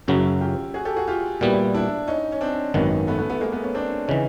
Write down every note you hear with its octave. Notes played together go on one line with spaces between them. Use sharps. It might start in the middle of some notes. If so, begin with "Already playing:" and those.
F#2 C#3 F#3 E4 F#4
F4 G4
F#4 G#4
G4 A4
F#4 G#4
F4 G4
A#2 G3 B3 E4 F#4
D4 E4
C#4 D#4
C#4
C4 D4
G#1 F#2 D#3 B3 C#4
A3 B3
A3 B3
A3 B3
G#3 A#3
A3 B3
B3 C#4
C4 D4
C#3 E3 C#4 D#4